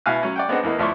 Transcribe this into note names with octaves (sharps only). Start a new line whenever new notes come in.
B2 E4 F5 G#5 F#6
F#3 C#4
D5 F#5 G5
B3 C4 D4 D#4 G#4 F#5
E2 E3 A#3 D#4
D2 F3 E4 D5 C6 C#6